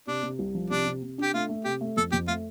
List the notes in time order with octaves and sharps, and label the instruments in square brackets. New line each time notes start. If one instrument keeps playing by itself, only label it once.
[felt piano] C3 [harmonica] D4
[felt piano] C3
C2
F3
[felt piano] C3 [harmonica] D4
[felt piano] C3
C3
[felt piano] D4 [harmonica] G4
[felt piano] A3 [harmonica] F4
[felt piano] A3
[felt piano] C3 [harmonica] G4
[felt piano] A3
[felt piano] F2 [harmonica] A4
[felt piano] F2 [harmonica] G4
[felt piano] A3 [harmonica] F4